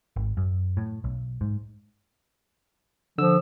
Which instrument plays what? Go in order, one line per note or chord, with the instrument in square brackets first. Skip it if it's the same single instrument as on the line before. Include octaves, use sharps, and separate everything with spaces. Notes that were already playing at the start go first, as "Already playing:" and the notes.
[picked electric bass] G#1
F#2
A2
B1
G#2
[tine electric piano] D3 E6 [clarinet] F3